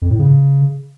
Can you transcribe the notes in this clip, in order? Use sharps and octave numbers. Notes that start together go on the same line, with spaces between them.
F2
A2
C#3